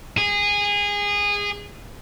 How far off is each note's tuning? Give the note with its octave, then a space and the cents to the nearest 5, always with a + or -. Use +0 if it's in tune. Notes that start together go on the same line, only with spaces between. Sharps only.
G#4 -20